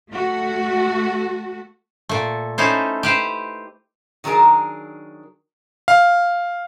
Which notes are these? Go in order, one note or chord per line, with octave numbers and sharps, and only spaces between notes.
A3 F#4
A#2 A3
A3 C#4 D#4 E4 C5
G4 B4 C5
D#3 F#3 D4 G#4 A#4
F5